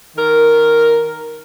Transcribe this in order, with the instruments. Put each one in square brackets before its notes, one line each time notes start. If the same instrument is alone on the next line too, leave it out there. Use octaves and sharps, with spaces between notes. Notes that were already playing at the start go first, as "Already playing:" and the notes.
[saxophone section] D#3 A#4